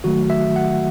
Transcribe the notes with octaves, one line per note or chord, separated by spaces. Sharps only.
D#3 F#3 A3 F#4
E5
F#5